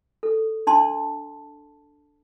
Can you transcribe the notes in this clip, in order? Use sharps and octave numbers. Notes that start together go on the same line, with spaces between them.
A4
D4 A5 C6